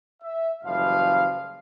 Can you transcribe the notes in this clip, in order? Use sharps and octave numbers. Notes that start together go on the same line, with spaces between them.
E5
F#1 E3 F3 G3 F5